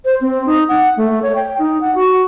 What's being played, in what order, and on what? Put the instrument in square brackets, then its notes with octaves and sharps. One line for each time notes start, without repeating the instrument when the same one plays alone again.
[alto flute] C5
C4
D#4
F#5
A3
C#5
G5
D#4
F#5
F#4